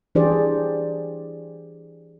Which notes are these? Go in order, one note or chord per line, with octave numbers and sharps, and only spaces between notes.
E3 D4 G4 G#4 C5 D5